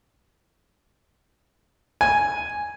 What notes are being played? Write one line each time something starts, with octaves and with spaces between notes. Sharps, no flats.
G#5